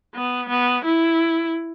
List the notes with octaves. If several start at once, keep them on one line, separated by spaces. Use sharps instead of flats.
B3
B3
E4